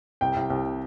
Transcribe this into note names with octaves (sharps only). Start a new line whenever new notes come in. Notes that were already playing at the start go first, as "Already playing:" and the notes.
C2 G5
C2
C2